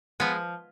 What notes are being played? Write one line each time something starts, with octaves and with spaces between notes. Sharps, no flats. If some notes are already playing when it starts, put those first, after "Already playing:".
F3 G#3 B3